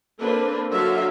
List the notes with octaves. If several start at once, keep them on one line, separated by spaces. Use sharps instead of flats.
A#3 C4 D4 A4 B4
D3 F#3 F#4 E5 F5